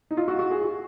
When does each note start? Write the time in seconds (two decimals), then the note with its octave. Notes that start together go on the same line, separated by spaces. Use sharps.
0.11 D#4
0.17 F4
0.28 F#4
0.39 F#4
0.51 G#4
0.61 F#4